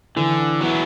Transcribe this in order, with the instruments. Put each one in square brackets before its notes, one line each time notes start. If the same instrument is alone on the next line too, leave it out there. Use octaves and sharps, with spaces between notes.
[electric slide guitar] D3 [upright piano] E3
[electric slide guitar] F#3 B3 E4